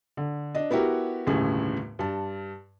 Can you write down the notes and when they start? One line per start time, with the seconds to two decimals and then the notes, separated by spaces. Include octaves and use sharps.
0.17 D3
0.55 D4 D#5
0.71 B3 E4 F#4 G4 A#4
1.27 G1 D#2 A2 C#3 G#4
1.99 G2 A5